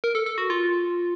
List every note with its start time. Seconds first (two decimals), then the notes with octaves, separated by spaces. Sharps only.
0.04 A#4
0.15 A4
0.26 A4
0.38 F#4
0.50 F4